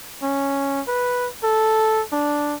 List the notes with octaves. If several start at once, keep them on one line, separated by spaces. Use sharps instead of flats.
C#4
B4
A4
D4